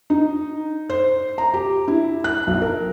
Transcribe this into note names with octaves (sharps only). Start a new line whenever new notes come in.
D#4
C5
A#5
G4
E4
F#6
B1
A#4